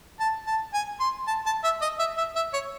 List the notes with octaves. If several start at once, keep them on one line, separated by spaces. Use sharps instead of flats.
A5
A5
G#5
C6
A5
A5
E5
D#5
E5
E5
E5
C#5